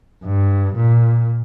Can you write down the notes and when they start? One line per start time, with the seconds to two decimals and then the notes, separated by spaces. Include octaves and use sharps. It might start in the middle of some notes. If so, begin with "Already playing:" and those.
0.25 G2
0.75 A#2